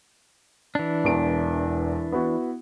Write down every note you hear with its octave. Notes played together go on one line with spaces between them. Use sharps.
E3 D4
E1 E2 D7
B3 E4 F#4